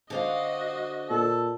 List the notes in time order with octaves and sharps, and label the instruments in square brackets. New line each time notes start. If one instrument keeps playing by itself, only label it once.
[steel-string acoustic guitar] D3 C5 F5 [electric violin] F#4 D#5
[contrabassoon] A#2 [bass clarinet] A4